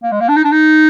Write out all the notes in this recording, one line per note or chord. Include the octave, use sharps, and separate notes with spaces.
A#3
G#3
A#3
D4
D#4
D4
D#4